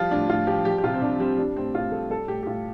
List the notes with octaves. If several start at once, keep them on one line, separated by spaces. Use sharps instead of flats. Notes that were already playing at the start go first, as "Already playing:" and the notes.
Already playing: F3 G3 F4
A2 D4
A2 F4
F3 G4
G3 G4
G4
C3 F4
C4
C3 D4
G3 C4
G3 D4
A2 C4
A2 F4
G3 A4
G3 A4
A2 G4
G4
A2 F4